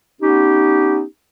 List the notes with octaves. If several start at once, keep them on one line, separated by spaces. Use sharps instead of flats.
B3 C#4 D#4 G4